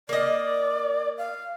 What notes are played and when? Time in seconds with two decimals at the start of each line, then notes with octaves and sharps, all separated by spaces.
0.09 A#3 D5 D#5
1.18 F5